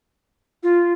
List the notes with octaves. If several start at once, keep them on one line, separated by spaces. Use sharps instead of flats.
F4